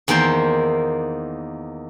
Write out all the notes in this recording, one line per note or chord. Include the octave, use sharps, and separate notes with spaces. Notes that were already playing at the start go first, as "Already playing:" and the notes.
E2 D#3 A#3 C5 G5